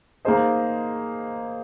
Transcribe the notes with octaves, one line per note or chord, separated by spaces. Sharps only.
A#3 D#4 G#4 C5 D#5